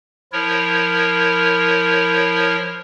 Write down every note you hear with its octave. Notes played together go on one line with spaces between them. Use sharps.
F3 E4 A#4 C#5